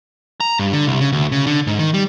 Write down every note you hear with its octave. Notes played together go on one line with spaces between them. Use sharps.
A#5
G2
D3
C2
C#3
D2
C#3
D3
G#2
D#3
G3